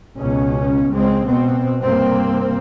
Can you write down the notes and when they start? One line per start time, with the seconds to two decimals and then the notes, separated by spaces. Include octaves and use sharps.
0.17 C#2 B2 C#4
0.92 C#2 G#3 C4
1.27 B2 B3 C4
1.82 G2 C3 A#3 C4